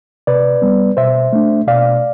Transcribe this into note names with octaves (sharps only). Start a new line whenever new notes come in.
C3 B4 D5
G3 B3
B2 C5 E5
A3 D4
B2 D5 F5